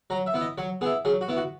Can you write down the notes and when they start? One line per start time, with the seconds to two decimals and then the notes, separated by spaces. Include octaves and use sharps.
0.10 F#3 A#5
0.26 E5
0.34 B3 E4
0.41 D#5
0.58 F#3 C#5
0.81 B3 G#4
0.85 E4
1.05 F#3 G#4
1.21 F#4
1.28 B3 E4
1.37 F#4